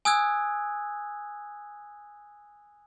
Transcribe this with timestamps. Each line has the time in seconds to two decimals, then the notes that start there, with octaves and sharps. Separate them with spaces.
0.05 G#5 D#6 E6 F#6 G#6